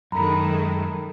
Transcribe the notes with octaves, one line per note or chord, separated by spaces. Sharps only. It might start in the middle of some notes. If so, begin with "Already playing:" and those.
F#2 D#3 G#3 A3 A#5 B5